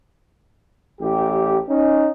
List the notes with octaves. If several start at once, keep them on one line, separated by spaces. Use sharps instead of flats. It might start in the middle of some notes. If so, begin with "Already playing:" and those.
A1 G4
C#4 D#4